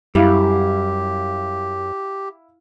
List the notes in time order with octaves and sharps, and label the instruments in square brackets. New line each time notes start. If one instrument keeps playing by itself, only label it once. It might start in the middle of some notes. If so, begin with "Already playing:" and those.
[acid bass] F#2 [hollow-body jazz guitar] G3 [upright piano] E4 F5 [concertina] G4